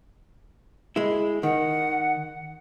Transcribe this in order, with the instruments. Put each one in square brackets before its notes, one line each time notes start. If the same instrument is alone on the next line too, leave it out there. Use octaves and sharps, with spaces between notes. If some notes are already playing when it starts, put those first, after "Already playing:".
[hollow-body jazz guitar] G#3 E4
[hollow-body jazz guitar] D#3 [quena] F#5